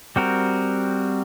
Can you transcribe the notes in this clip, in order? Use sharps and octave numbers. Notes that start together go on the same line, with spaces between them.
G3 C4 F#4 A#4